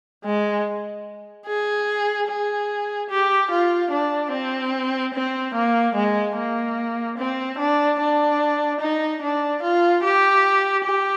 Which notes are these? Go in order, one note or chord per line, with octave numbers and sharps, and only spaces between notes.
G#3
G#4
G#4
G4
F4
D4
C4
C4
A#3
G#3
A#3
C4
D4
D4
D#4
D4
F4
G4
G4